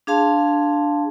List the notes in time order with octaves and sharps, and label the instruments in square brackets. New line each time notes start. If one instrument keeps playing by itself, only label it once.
[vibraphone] D4 G#4 F5 A5 C6